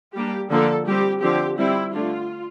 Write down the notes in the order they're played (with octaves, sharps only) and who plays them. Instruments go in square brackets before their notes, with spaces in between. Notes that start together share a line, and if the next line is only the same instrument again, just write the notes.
[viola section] G3 A#3 D4 G4
D3 F3 A#3 D4 A4
G3 C4 G4
D3 F3 C4 G4
G3 C4 E4
D3 A3 D4 F4